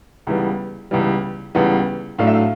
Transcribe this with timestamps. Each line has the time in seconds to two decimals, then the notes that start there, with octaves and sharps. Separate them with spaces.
0.27 C#2 C#3 E3 G3 B3
0.91 C#2 C#3 E3 G3 B3
1.55 C#2 C#3 E3 G3 B3
2.18 A2 F#3 A3 D4 F5
2.27 E5
2.34 F5